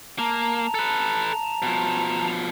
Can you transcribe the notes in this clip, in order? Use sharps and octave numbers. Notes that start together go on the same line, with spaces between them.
A#3 A5 A#5
A4 B4
B2 F3